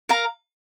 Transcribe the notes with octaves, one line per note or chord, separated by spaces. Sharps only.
A#4 F5 A#5